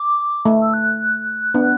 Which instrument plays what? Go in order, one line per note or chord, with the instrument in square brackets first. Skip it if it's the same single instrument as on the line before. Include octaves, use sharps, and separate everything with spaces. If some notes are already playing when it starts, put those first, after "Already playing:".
Already playing: [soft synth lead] D6
[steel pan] A3
[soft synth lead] E6
F#6
[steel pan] B3 D4